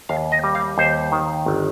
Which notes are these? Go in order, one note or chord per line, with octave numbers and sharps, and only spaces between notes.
D#2 F5
D#5
G3
F5
D#2 C5
D#3
G1